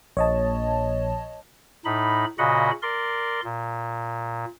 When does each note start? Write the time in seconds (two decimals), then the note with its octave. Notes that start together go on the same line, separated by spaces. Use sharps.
0.17 A#1 C#5 D#5 A5
1.85 A2 D#4 B5
2.39 A#2 C#3 F#4 D#5 F#5 B5
2.82 A#4 D5 C6
3.44 A#2